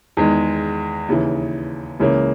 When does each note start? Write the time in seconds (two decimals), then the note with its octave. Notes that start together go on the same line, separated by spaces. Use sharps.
0.17 E2 D#3 G#3
1.09 D#2 C#3 E3
2.00 C#2 C#3 E3 A#3 C#4